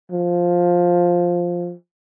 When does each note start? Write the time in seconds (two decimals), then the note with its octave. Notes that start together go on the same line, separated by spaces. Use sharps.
0.11 F3